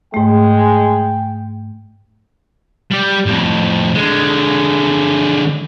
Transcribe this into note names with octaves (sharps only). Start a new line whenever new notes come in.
G#2 G#3 A3 G5
G3 G4
F2 A2
D3 G#3